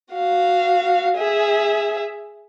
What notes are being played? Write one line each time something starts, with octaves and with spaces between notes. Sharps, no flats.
F#4 F5
G#4 E5